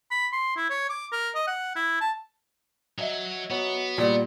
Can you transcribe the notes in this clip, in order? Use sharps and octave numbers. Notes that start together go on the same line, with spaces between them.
B5
C6
E4
C#5
D6
A#4
D#5
F#5
E4
A5
F#3 D#5 E5
F#3 B3
A#2 G3 D5 G5